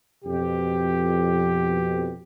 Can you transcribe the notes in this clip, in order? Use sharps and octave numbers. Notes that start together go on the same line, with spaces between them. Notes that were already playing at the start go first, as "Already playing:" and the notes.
F2 B2 G4